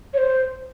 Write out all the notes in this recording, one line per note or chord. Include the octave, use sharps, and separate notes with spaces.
C#5
C5